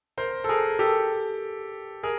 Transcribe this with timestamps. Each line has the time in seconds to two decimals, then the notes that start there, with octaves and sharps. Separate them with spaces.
0.18 A#4 C5
0.44 A4
0.49 G#4 A#4
0.79 G4 A4
2.03 G#4 A#4